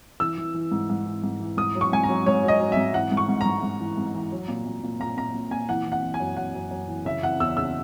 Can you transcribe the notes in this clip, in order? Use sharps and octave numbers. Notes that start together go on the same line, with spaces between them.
E3 E6
E3
E3
G#2
G#2
E3
G#2
E3
G#2 D#6
F#3
C#6
G#2 G#5
A#5
F#3
G#2 C#5
F#3
D#5
F#3
G#2 E5
E3 F#5
G#2
C#6
G#2
G#2 A#5
G#2
E3
G#2
E3
F#3
A#2
A#2
A#2
A#2 A#5
A#2 A#5
A#2
A#2 G#5
E3 F#5
E3
F#5
E3
G#5
F#2
F#2 F#5
F#2
F#2
E3
C#3 E5
E3 F#5
E2 E6
C#3 E6